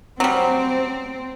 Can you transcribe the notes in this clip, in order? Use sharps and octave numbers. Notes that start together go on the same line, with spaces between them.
F#3 G3 C4